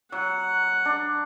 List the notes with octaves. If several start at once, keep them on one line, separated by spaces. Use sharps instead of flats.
F#3 F#5
D4